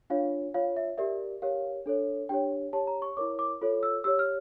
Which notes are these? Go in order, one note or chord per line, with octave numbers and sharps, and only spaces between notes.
D4 F4 C#5 F5
F4 C#5 F5
E5
G4 A#4 D5 E5
G4 A#4 C#5 F5
D4 A4 C#5
D4 G4 C#5 G5
G4 C#5 A5
A#5
C#6
E4 A#4 C#5 D6
D6
F4 A4 C#5
E6
G4 C#5 E6
F6